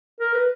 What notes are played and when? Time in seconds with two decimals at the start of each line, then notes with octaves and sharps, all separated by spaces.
0.20 A#4
0.34 B4